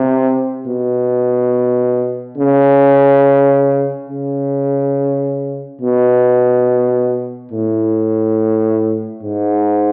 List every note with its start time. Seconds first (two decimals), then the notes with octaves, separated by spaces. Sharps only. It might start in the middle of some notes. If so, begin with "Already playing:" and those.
Already playing: C3
0.67 B2
2.38 C#3
4.09 C#3
5.81 B2
7.52 A2
9.23 G#2